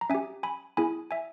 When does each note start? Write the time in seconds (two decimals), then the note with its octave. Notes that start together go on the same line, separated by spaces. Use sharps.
0.01 A#5
0.10 C#4 G4 E5 G#5
0.43 G#5 B5
0.77 B3 E4 G#4 G#5 B5
1.11 E5 G#5